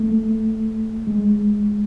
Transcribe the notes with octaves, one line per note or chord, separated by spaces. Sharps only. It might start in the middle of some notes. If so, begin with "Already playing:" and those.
Already playing: A3
G#3